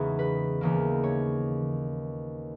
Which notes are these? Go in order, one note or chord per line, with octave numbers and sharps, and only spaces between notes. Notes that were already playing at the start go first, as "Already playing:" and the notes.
Already playing: E2 C#3 E3 G#3 B3 D#4 C#5
B4
D#2 C#3 E3 A#3
C#5